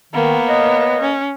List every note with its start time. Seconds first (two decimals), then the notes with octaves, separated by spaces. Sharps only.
0.14 D#3 A#3 B3
0.48 B4 C#5 D#5
1.02 C#4